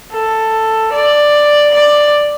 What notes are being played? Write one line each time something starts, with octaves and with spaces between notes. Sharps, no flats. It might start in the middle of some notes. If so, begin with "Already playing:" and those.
A4
D5
D5